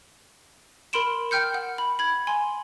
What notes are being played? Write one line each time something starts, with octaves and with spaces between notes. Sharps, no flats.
A#4 B5 C6 D7 E7
G5 F6 G6 C#7
F#5
B5
B5 G#6
G#5 C6